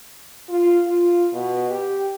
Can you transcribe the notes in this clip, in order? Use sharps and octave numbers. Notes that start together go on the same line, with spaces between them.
F4
F4
B2
G4